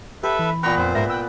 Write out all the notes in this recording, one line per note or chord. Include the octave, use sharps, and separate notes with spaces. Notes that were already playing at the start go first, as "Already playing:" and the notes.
G4 A4 B4 E5 B5
E3
A#2 B3 B4 G5 A#5 C#6
F2 C4 C5
G#2 A#4 C5 E5 A#6
G5 E6 F#6